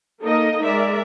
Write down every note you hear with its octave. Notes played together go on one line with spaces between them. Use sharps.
A#3 D#4 A4 A#4 D#5
G#3 A#4 D5 E5